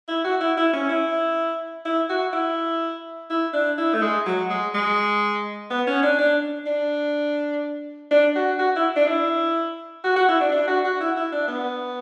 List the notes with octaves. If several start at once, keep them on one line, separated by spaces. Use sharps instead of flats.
E4
F#4
E4
E4
C#4
E4
E4
F#4
E4
E4
D4
E4
A3
G#3
F#3
G#3
G#3
B3
C#4
D4
D4
D4
D4
F#4
F#4
E4
D4
E4
F#4
F#4
E4
D4
D4
F#4
F#4
E4
E4
D4
B3